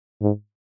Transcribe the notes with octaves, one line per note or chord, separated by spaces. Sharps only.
G#2